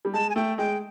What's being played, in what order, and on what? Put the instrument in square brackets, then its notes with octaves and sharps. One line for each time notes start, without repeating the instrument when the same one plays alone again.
[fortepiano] G3
[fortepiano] G#3 [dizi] A5
[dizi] G#5
[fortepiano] A3 [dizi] G5
[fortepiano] G#3 [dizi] G5